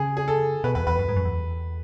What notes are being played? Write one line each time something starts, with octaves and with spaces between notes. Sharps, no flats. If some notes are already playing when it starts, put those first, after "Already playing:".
Already playing: C#3 G#4
G#4
A4
B2 B4
E2 B4
E2 B4
F#2
G#2
F#2
E2